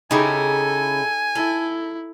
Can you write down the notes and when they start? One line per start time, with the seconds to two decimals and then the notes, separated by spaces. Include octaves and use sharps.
0.11 C#3 D#4 E4 G4 A4 G#5
1.35 E4 A4